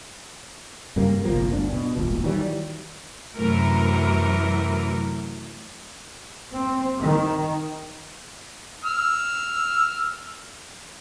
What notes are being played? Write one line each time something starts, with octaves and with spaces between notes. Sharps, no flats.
G2 C#3 G3 A#3
G1 C2 F3 A#3
G1 D2 C4 D4
B2
D#1 G#1 A#2
D#3 E3 F#3 G3
F#2 C3 E3 F#3 A3 A#4
C4
D#3
E6 F6